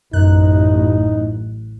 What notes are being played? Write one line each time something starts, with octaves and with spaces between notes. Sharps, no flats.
A1 F#2 D#4 F#6